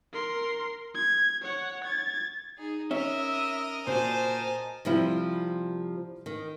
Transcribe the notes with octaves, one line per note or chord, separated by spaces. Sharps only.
A#4 C6
G#6
C#5 F#5
G#6 A6
D#4 G#4
C#4 A#4 C#5 D#5 E5
D#6
A#2 F#4 C5 G#5 A5
C3 F3 G3 E4
D#3